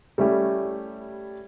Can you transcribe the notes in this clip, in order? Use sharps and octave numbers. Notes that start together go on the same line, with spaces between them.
G3 A3 C#4 E4 G4